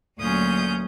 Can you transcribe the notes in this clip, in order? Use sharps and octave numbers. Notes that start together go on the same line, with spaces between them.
D2 A#2 F#3 C#4 D#6 G6